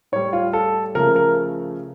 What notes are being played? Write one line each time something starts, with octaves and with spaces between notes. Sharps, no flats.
A2 G3 C#5
F4
A4
C#3 F3 A3 A#4
A#4